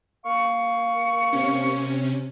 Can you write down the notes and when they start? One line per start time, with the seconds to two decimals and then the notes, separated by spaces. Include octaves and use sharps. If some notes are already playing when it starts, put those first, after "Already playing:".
0.25 A#3 F5 C#6
1.33 C3 C#4